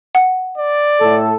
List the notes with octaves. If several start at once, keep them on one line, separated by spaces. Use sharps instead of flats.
F#5
D5
A2 A4